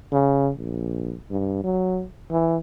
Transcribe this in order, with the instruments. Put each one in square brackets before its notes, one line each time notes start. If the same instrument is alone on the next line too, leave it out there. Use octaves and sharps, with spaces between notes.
[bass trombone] C#3
A#1
G2
F#3
E3